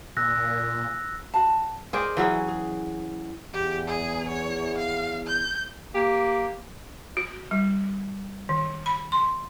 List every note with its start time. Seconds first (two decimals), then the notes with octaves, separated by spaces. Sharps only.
0.17 A#2 E6 F#6 A#6
1.34 F#4 A5
1.93 G#4 A#4 C5 D5 D#5 G5
2.17 E3 F#3 C#4 E4 G#4
2.48 G#4
3.53 E2 G4
3.87 G#4
4.28 C#5
4.78 F5
5.27 G6
5.94 A#3 G4
7.17 F#4
7.51 G3
8.49 D#3
8.86 B5
9.12 C6